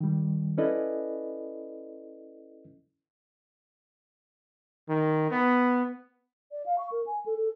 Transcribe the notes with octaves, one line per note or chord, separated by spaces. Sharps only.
D#3 G3
C#4 E4 A4 B4 D5 D#5
D#3
B3
D5
F5
C#6
A#4
G#5
A4
A4